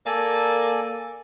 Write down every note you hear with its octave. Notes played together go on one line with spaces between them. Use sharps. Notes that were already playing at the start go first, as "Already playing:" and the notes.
A#3 A4 D5 G#5